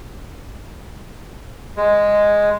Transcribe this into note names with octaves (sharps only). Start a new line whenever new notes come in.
G#3